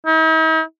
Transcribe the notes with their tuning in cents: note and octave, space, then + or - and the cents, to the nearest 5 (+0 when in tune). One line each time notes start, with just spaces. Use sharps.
D#4 +45